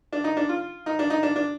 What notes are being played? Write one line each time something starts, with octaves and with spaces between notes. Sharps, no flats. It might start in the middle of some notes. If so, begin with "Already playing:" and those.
D4
D#4
D4
F4
D#4
D4
D#4
D4
D4